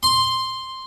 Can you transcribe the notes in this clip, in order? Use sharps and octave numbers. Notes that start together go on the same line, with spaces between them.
C6